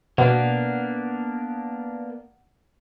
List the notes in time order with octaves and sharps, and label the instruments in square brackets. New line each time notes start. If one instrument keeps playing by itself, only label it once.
[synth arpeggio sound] B2 [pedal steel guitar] A#3 B3 D4 [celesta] F#5